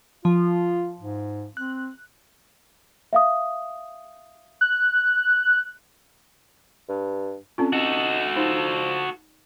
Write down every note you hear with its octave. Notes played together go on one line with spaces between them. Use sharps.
F3 F4
G#2
C4 F#6
E5 F5 D#6
F#6
G2
D3 C4 C#4 F4
D#4 F#4 A4
F3 D#4